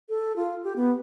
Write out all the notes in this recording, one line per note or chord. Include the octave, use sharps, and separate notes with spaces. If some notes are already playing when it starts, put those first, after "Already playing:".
A4
F4
G4
B3